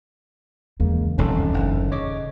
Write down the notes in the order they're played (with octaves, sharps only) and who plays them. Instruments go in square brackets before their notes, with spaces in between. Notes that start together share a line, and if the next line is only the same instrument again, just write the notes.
[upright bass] E2 [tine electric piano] C#3 G#3 A#3
[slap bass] D#1 C2 F2 [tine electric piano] C#4 D#4 A4
[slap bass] F#1 A2 D3
[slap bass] C#3 [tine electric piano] C#5 D#5 D6